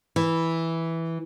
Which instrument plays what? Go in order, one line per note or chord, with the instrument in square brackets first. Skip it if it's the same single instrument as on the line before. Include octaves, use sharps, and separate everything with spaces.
[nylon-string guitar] E3